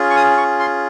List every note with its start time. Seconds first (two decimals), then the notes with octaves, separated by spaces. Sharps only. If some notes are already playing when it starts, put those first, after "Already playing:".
Already playing: C#4 F4 G#4
0.10 C#6
0.16 D#6
0.37 C#6
0.60 C6